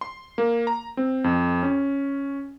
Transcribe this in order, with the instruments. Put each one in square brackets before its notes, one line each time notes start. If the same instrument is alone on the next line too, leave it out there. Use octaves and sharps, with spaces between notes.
[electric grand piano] C6
A#3
A#5
C4
F2
C#4